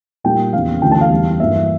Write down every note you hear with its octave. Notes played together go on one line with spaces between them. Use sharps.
A#2 G3 A#3 G5
E2 C#3 G3 A#3 F5
D2 C#3 E3 A3 G5
A5
F5
E2 C#3 G3
G2 E3 A#3 E5